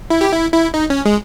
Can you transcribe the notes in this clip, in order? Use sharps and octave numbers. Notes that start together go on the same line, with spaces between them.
E4
G4
E4
E4
D#4
C#4
G#3